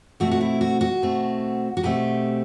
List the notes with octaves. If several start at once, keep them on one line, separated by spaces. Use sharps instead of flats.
B2 A3 C4 F#4
F#4
E4
F#4
F#4
B2 A3 C4
F#4
B2 A3 C4 G4